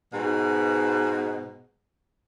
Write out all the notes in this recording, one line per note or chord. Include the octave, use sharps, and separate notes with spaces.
G#2 B2